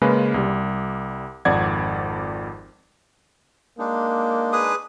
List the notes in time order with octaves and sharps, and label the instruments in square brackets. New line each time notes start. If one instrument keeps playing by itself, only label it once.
[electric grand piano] C#3 G#3 A#3 C#4 B4
C2 G3
G#1 F2 D5 F#5 G#6
[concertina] G#3 D4 D#4 [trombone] A#3
[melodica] G#4 B4 D#6